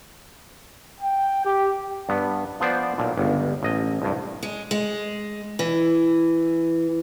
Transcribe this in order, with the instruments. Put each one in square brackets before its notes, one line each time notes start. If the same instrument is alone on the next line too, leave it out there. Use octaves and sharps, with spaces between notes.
[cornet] G5
G4
[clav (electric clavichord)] G2 B3
F3 B3 C5 D5
B1 A#2
G1 C#2
A1 D#5
C2 G2
[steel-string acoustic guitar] G#3
G#3
E3